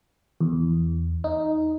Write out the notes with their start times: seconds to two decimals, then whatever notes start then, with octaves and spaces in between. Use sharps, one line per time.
0.41 E2
1.24 D#4